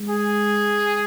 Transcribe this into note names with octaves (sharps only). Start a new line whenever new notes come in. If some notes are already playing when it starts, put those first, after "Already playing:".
Already playing: G#3
G#4